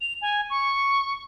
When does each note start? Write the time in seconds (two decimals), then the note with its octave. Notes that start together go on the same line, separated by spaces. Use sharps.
0.01 F7
0.22 G#5
0.50 C#6